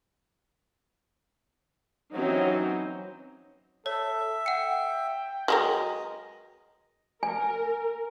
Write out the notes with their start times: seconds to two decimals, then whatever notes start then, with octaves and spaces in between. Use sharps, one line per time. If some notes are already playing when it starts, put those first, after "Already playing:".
2.14 E3 F#3 C4 C#4 D#4
3.86 A4 C#5 E5
4.46 F#5 G5 C#7
5.48 F#3 G#3 A#4 B4 D#5 F6
7.23 A#4 G#5